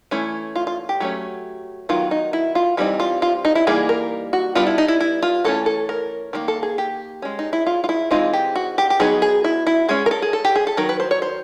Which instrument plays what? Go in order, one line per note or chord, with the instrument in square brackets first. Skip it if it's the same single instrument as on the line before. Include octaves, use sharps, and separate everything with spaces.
[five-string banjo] E3 A3 C#4
F4
F4
G4
F#3 A3 C#4
D#3 F#3 B3 F4
D#4
E4
F4
E3 G3 C4 D#4 E4
F4
F4
D#4
E4
E3 G3 A#3 D#4 G#4
A#4
F#4
G3 B3 D4 F4
E4
D#4
E4
E4
F4
E3 A3 C#4 A4
A4
A#4
D#3 G3 A#3
A4
G#4
G4
G#3 C#4
D#4
E4
F4
F4
E4
E3 G#3 C4 D#4 F4
G4
F#4
G4
G4
F#3 B3 D#4 G#4
G#4
E4
E4
G#3 C#4 G#4
A#4
A4
G#4
A4
G4
G#4
A4
D#3 F#3 A#4
B4
C5
C#5
C5